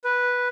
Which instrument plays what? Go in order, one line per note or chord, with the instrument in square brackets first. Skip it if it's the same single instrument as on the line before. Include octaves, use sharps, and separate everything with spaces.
[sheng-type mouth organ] B4